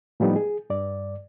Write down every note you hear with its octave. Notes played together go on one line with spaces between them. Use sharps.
A2 F3 G3 B3 D#4
G#4
G2 D5